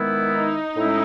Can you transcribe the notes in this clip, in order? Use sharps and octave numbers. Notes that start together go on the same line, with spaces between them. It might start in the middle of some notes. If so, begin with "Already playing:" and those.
Already playing: D#3 G#3 B3 E4
D#4
A2 G#3 C#4 E4